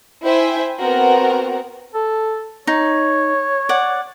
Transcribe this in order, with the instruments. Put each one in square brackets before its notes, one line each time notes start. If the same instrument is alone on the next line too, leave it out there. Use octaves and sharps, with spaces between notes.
[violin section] E4 C5 E5 G5 G#5
B3 C4 F#4 A#4
[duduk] A4
[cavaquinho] D#4 [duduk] C#5
[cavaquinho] D5 F#5